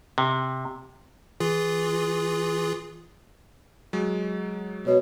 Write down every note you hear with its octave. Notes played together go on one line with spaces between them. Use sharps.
C3
E3 F4 G#4
F#3 G#3
B2 C#5